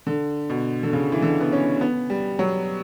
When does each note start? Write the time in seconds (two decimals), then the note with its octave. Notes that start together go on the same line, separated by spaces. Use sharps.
0.07 D3
0.50 B2
0.83 D3
0.93 C#3
1.12 E3
1.22 D3
1.40 B3
1.52 C#4
1.81 B3
2.10 G3
2.39 F#3